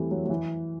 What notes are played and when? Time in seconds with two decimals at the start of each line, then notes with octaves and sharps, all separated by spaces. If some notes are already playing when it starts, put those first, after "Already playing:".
Already playing: E3 G3 A3 C4
0.11 F#3
0.25 F#3
0.30 E3